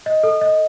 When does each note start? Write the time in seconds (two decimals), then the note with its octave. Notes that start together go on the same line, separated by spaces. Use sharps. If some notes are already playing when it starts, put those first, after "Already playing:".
0.06 D#5
0.23 A4
0.41 D#5